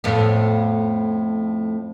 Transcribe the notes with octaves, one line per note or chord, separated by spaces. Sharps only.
F2 A2 B3